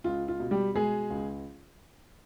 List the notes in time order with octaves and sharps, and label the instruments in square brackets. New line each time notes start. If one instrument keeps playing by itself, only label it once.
[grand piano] C#2 F4
F4
B2
G3 G4
B2 G#3 G#4
C#2